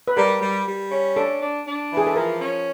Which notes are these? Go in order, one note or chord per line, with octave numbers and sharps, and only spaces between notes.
B4
G3 A#4
G3
G3
C#4
D4 A4
D4
D4
E3
G#4
A4
F3 A#4
C#4